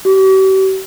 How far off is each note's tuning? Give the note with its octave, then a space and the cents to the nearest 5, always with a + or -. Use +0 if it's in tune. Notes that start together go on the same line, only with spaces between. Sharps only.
G4 -45